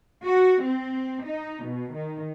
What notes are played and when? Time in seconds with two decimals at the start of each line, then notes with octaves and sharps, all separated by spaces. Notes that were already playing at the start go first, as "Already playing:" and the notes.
0.24 F#4
0.63 C4
1.26 D#4
1.65 B2
1.95 D#3